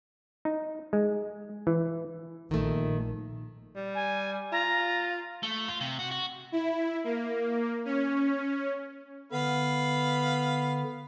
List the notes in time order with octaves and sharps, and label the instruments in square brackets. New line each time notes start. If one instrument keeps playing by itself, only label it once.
[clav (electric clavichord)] D#4
G#3
E3
[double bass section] A#1 [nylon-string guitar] D#3 A3
[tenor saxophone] G3
[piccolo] G#5
[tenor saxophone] F4 [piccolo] A#5
[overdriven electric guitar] A3
F4
C3
F#4
F#4
[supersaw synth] E4
A#3
C#4
[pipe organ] D3 [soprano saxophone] B3 [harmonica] F5 B5